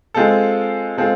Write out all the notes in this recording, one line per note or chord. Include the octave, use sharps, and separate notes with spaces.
G#3 C4 F4 A4
G#3 C4 F4 A4